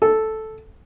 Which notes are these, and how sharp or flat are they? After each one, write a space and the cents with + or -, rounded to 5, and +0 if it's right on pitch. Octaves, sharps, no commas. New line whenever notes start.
A4 -5